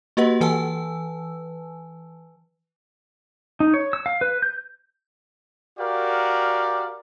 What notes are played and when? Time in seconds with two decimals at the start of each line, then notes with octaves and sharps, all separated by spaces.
0.17 A#3 F#4 G4 B4 D#5 F#5
0.41 E3 B4 G#5 A5 E6
3.60 D#4
3.74 C#5
3.93 E6
4.06 F5
4.21 B4
4.42 G6
5.78 F#4 G4 A#4 D5 F5